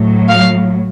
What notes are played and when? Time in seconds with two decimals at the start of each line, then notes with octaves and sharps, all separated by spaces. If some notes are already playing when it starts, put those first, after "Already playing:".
Already playing: A2 F#3
0.28 F5